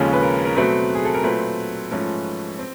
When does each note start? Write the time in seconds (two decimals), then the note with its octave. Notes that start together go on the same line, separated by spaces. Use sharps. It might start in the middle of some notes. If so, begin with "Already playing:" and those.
Already playing: D#2 C#3 F3 G#3 C#4 A4
0.13 B4
0.23 A#4
0.45 A#4
0.56 B2 F#3 A3 C4 B4
0.95 G#4
1.05 A4
1.14 A#4
1.23 A#2 F#3 A3 C4 B4
1.91 G#2 F3 A3 C#4
2.59 C4